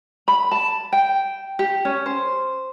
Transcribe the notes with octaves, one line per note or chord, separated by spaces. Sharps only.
B5
A5
G5
G4
C#4
C5